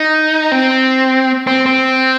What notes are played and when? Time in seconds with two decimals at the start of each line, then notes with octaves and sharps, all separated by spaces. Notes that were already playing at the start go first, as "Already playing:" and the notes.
Already playing: D#4
0.52 C4
1.47 C4
1.66 C4